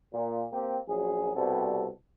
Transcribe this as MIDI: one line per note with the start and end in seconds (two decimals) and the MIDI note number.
0.13 0.44 46
0.51 0.76 58
0.51 0.76 60
0.51 0.76 67
0.87 1.32 34
0.87 1.32 42
0.87 1.32 54
0.87 1.32 68
1.35 1.86 36
1.35 1.86 47
1.35 1.86 55
1.35 1.86 60
1.35 1.86 69